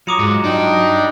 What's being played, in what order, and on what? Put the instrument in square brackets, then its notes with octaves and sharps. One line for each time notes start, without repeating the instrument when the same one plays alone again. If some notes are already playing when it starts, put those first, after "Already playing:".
[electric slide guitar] F#3 F4 A#5 [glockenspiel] D6 D#6 C#7
[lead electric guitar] G#2
[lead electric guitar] D4 G4 [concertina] D#4